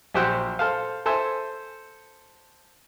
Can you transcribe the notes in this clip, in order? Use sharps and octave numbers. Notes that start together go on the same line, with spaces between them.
A#1 F#3 G4 C5 F#5 E6
A4 C5 F5
A4 C5 E5 G#5